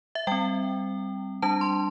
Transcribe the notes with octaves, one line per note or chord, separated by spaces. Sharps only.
E5
G3 C4 G5
G3 D4 A5
C6